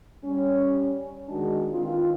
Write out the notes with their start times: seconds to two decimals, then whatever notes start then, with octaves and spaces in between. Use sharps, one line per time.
0.24 G3 C#4
1.29 D#3 G#3 D4 F#4 G#4
1.70 D#3 E3 C4 F4